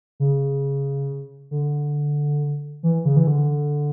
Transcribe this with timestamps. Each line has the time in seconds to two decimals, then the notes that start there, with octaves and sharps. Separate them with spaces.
0.20 C#3
1.51 D3
2.83 E3
3.05 C#3
3.16 E3
3.27 D3